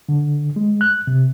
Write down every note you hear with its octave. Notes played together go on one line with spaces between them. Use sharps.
D3
G#3
F#6
C3